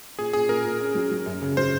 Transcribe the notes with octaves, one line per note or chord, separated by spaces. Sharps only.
A#2 G#4
A#2 G#4
A#2 A#4
A#2
C#4
F#3
F#3
F#2
C#3
F#3 C5